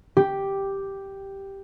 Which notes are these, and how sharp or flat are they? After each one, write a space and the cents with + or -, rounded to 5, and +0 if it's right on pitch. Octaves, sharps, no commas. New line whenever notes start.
G4 +0